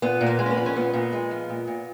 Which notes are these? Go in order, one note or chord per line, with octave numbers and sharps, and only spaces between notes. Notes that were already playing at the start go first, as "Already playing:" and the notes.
A#2 B3
A#2
A#3
G#3
C#4
B3
F3
C#4
A#2 B3
A#2
G#3
F3
A#2
A#2